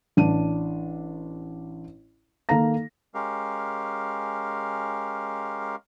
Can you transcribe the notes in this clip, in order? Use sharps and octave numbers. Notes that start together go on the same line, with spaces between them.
A1 D4 D#7
D#3 A#3 A4 F5 A#5 A#6
G#3 C#4 G4 A#4 F5